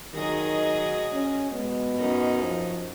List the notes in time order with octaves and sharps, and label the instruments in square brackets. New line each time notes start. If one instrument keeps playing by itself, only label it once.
[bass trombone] D#3 [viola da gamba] F#3 G#4 D#5
[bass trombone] C#4
[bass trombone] B2 [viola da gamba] G#3
[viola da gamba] F#2 C#4 D#4
[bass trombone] F3